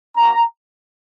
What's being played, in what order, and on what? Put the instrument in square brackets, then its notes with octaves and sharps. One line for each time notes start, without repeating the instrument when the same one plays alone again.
[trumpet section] A#3 C#4 F#4 A#5